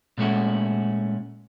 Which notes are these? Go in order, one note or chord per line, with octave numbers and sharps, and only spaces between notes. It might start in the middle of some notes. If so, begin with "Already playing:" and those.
A#2 G#3 A3 C#4 F#4